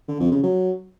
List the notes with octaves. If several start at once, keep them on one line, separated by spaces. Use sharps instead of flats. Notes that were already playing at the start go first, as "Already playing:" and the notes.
D3
F2
C#3
F#3